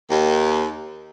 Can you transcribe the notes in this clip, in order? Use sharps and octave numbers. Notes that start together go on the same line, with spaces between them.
D#2